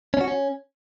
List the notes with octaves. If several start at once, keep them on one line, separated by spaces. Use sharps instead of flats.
C#4
F#4
C#4